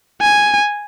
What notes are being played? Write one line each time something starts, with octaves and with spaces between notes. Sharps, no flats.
G#5